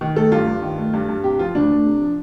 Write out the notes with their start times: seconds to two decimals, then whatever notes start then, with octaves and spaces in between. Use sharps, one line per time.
0.01 D#3
0.16 A3 A4
0.32 G2 F4
0.47 G2
0.62 D#3
0.78 A3
0.94 G2
1.09 G2
1.24 C3 G4
1.39 F3 F4
1.55 D2 D4
1.70 A3
1.86 C3
2.01 F3